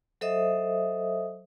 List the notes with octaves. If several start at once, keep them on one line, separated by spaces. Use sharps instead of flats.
F#3 A4 C5 D#5 E5 D#6